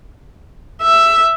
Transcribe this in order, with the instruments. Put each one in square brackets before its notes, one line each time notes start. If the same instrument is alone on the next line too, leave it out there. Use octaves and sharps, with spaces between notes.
[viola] E5